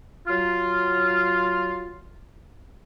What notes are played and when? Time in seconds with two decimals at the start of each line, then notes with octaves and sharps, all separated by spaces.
0.28 F#3 F4